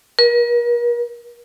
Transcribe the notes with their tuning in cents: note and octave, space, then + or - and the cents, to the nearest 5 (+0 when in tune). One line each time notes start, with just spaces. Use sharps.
A#4 +40